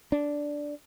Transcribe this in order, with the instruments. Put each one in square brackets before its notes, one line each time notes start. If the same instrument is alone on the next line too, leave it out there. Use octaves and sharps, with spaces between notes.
[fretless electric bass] D4